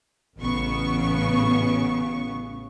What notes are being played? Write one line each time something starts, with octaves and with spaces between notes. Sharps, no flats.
A1 C#3 B3 C#6